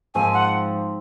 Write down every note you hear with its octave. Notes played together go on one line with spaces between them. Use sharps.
G#2 F3 C4 G#5
F#5